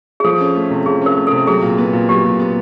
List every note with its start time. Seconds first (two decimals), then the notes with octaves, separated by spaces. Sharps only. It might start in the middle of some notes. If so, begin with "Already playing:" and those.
0.20 G#4
0.24 F3 A4
0.40 C#4
0.55 A3
0.70 C3
0.86 F3 G#4
1.02 C#4 A#4
1.17 A3
1.27 A4
1.32 C3
1.47 F#3 G#4
1.62 A#2
1.78 B3
1.93 A#2
2.09 F#3 G4
2.25 A#2
2.39 B3